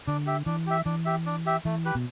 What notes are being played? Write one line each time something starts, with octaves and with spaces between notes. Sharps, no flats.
D3 D4
G4 E5
E3 D4
G4 E5
E3 D4
G4 E5
D4
G4 E5
E3 A3
G4 B4
B2